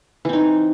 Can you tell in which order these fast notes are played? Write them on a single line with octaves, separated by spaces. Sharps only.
E3 C4 D#4